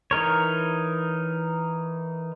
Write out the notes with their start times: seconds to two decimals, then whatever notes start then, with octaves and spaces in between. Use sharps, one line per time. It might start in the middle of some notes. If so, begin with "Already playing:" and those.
0.11 E3 D#4 A#4 C#5